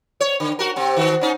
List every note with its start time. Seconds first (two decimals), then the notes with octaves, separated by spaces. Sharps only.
0.20 C#5
0.40 D3
0.59 F#4 A#4
0.76 C3 C4
0.96 D#3 F#4
1.21 C#4 D#4